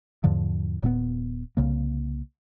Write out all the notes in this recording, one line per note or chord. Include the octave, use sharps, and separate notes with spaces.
E2 G#2 D3 F3
D#1 A#2 A#3 B3
C2 C#3 A#3